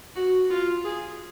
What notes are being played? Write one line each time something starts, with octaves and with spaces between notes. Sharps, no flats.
F#4
F4
G#4